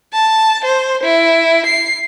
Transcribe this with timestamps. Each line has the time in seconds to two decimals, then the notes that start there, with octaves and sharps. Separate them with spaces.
0.13 A5
0.64 C5
1.03 E4
1.66 C7